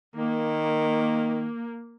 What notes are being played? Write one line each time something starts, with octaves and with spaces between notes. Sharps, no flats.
D#3 A#3